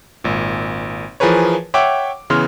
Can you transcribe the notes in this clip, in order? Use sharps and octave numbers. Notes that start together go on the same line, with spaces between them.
G#1 A#2
E3 F3 G#4 A#4 B4 C#5
C#5 E5 F#5 G5 C#6 D6
C#3 E3 B3 C6 F6